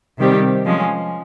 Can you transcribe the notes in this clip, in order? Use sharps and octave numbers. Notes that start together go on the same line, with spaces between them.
C3 D#3 G3 C4 G4
F3 G#3 C#4